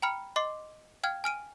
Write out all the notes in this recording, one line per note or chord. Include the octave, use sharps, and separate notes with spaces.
G5 A#5 B5 F6 C#7
D#5 C6 D6 C7
F5 G5 F6 G#6
G#5 F6 D7 D#7